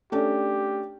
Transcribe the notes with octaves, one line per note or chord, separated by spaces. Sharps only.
A3 C#4 D4 G4